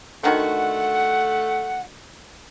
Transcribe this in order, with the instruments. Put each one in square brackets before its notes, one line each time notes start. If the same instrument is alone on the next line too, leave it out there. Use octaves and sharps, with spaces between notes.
[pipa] D3 D#3 F#4 [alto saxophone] A3 [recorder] F#5